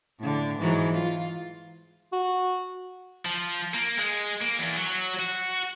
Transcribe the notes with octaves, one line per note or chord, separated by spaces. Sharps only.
A2 D3
G#2 E3 F#3
F4
F#4
F3
A#3
G#3
A#3
E2
F#3
F#4